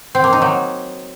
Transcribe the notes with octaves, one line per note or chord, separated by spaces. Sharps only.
C4
A#3
D#4
F#3